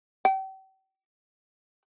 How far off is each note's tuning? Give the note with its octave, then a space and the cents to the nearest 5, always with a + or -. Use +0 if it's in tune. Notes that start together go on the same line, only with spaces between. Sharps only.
G5 -40